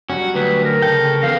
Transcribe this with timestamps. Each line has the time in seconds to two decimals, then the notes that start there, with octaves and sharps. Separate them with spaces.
0.10 F#3 G3 C#4 F#4
0.35 D2 B4
0.64 A#4
0.82 C#3 A4 G5
1.23 E2 B3 F5